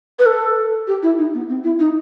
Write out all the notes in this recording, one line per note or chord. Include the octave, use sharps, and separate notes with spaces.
B4
A4
G4
E4
D#4
B3
C4
E4
D#4